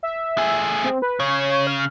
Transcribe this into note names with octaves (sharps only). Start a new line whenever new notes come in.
E5
A3 G#4
C4
B4
C#3 C#5
F6